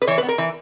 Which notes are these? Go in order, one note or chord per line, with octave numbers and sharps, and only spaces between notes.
B4
E3 C#5
B4
B3
A#4
E3